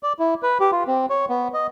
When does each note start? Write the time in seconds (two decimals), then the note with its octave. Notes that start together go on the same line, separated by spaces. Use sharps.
0.03 D5
0.19 E4
0.43 B4
0.60 G4
0.72 F4
0.87 C4
1.10 C#5
1.29 B3
1.54 D#5